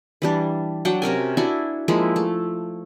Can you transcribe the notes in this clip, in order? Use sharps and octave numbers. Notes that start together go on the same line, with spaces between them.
E3 G3 D4
F#3 D4 F#5 G5
C3 C#4 A#4 G#5
D4 E4 F#4 G#5
F3 G#3 A#3 E4
A3